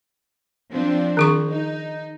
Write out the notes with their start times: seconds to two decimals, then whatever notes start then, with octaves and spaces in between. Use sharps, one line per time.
0.72 F3 C4 D4
1.17 D#3 G#4 C#6
1.51 D#4